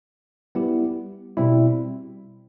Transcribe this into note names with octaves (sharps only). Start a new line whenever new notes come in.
G3 B3 E4 G4
B2 G3 C4 E4